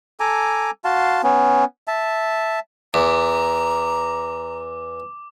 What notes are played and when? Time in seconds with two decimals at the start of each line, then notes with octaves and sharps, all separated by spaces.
0.20 A4 G#5 A#5 D6
0.84 F#4 F5 A5 C6
1.23 B3 C#4
1.88 E5 A5
2.94 E2 A#5 D6